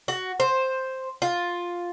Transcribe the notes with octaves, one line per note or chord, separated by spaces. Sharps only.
F#4
C5
F4